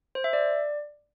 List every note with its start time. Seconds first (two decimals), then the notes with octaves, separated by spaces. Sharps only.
0.15 C5
0.24 E5
0.33 D5